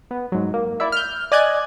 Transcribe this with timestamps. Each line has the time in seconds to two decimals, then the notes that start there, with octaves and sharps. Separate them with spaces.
0.11 B3
0.32 G#2 F#3
0.54 A#3
0.80 E4 D5 E5
0.92 F6 G6
1.32 D5 D#5 G#5 F#6 G#6